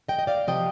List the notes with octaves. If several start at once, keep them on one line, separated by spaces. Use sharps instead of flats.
D#5 G5
D#5
D5 F5
C3 F3 D#5 G5